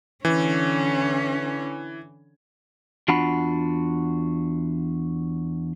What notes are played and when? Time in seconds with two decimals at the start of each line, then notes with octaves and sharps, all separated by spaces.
0.25 D3 E3 C#4
3.08 E2 D4 F4 F#4 F#5 B5